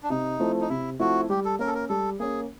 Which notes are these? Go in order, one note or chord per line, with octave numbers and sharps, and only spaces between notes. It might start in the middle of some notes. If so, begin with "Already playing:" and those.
D4
C3 D#4
F3 A3 C4 E4
D#4
C3 E4
F3 A3 C4 E4 F#4
G3 G4
A4
A#3 C#4 A#4
A4
A#4
G3 A4
A#3 C#4 G#4